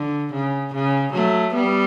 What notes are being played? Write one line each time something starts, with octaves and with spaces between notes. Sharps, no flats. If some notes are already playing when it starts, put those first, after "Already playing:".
Already playing: D3
C#3
C#3
F#3 A3
G3 B3